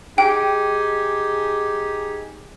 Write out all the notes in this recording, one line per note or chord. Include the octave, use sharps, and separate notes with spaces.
D#4 G4 G#4 G5